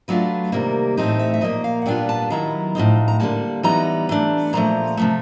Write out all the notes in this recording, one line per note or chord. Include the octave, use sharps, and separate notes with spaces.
F#3 A3 D4 F4 B4
C3 D#3 G3 A#3 A#4
A2 E3 A3 C4 D#4 C5
E5
E5
A#2 F3 A#3 D#5
F5
F#5
A#2 G3 B3 D4 F4 G5
A5
D#3 F#3 B3 E4 A#5
A2 F3 G#3 C4 D#4
A#5
D3 G3 A#3 A5
E3 G3 B3 D#4 A#5
E3 A3 D4
A#2 F3 A3 A#5
C3 F3 A3